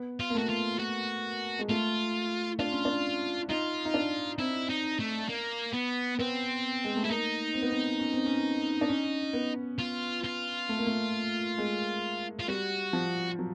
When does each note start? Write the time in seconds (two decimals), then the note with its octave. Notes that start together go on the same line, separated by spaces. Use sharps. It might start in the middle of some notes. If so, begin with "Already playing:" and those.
Already playing: B3
0.20 F4
0.30 A#3
0.35 A3 F#4
0.49 F4
0.80 F#4
1.59 G#3
1.70 A3 F4
2.59 D4 F4
2.72 C#4
2.85 D4
3.49 D#4 F4
3.85 D#4
3.94 D4
4.39 C4 E4
4.69 D#4
5.00 A3
5.29 A#3
5.74 B3
6.19 B3 C4
6.84 G#3
6.97 A3
7.04 E4
7.09 A#3 D#4
7.54 C4
7.62 B3
7.71 C4
7.99 C#4
8.13 C4
8.26 C#4
8.81 D4
8.89 C#4
9.33 B3
9.79 F4
10.24 F4
10.69 A3
10.79 A#3
10.87 A3
11.58 G#3
12.40 F4
12.48 G3 F#4
12.93 F3
13.39 F#3